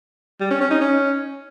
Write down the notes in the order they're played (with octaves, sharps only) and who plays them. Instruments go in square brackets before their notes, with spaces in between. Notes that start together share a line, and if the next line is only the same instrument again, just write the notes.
[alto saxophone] G3
C#4
C#4
D#4
C#4